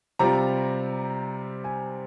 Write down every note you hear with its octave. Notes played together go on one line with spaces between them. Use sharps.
C3 G3 C4 F4 A#5
G#5